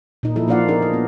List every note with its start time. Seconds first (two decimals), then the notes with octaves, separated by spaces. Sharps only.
0.23 A#2 D#4
0.36 F3 D#4 E4 A4
0.48 A#3 D4 F4 D5 F5 F#5
0.68 B3 D4 D#4 G#4 A#4
0.82 D#4
0.93 B3